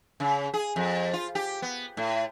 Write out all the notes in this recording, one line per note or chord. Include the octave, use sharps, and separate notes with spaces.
C#3
G#4
F2
F4
G4
B3
A2